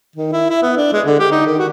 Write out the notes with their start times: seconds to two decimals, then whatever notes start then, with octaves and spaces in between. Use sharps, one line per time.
0.16 D#3
0.32 E4
0.50 E4
0.63 B3
0.77 D4
0.93 G#3
1.06 D3
1.20 G4
1.32 D#4
1.46 D#3
1.59 F#4